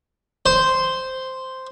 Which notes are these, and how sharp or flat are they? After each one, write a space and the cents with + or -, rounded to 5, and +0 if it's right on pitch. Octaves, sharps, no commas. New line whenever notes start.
C5 -5